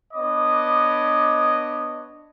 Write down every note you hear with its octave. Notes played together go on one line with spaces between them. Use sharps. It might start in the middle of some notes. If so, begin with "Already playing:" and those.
B3 D4 C#5 D#5 B5 D6